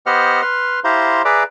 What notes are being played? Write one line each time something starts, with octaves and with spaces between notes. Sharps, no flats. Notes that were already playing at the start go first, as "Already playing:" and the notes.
B3 G4 C5 D#5 F#5 F6
B4 C6 F6
E4 G4 C5 F5 A#5 C6
G#4 B4 D5 E5 A#5 D6